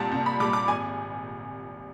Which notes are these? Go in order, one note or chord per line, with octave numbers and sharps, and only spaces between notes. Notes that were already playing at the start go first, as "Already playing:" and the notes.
Already playing: C2 A#2 G3 A5
C2
B5
A#2 G3 D6
D6
G#1 G#5